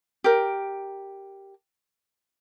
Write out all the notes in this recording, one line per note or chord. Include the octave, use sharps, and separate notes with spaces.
G4 A#4